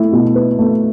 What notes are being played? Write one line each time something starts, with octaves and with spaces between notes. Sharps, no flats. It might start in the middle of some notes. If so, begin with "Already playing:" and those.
Already playing: A3 E4
B2
B4
A3